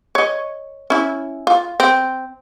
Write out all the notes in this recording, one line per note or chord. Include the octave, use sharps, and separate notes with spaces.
C#5 D#5
C#4 E4
F4
C4